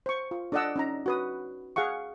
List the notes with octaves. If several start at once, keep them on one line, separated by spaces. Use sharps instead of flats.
C5 C#6
F4
D4 A4 D5 D#5 F#5 E6
C#4 D#4 A#5
F#4 B4 D#6
G#4 F5 F#5 C#6